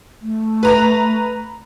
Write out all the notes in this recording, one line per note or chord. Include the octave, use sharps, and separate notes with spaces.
A3
B4 A#5